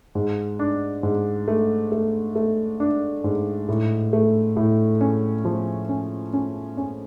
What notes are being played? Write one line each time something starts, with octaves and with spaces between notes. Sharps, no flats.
G#2
D4
G#2
A3
A3
A3
D4
G#2
A2
A3
A2
C#4
F3
C#4
C#4
C#4